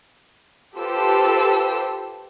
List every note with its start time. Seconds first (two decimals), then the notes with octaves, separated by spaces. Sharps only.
0.78 F4 G4 A4 B4 C5 E6